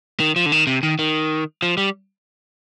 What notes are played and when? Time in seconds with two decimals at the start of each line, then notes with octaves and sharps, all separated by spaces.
0.20 D#3
0.36 F3
0.46 D3
0.52 D#3
0.67 C3
0.83 D#3
0.99 D#3
1.62 F3
1.77 G3